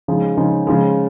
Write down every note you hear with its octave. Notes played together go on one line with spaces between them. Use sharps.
C#3 F3 G#3 D#4
C#3 F3 G#3 D#4
C#3 F3 G#3